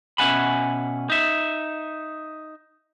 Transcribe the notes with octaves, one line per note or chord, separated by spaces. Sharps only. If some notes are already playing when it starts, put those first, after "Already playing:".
B2 C#4 E5 F#5 G#5 B5
D#4 E5